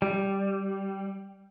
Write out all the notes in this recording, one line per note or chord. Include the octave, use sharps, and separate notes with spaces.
G3